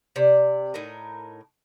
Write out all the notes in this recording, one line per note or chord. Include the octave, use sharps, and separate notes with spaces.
C3 D5
A2 D#4 A#4